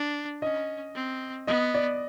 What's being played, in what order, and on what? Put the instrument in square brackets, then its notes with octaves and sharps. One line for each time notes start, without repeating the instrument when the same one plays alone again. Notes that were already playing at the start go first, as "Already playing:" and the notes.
Already playing: [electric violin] D4
[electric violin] C#4 [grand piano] D#5
[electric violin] C4
[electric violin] B3 [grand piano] D#5
[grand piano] D5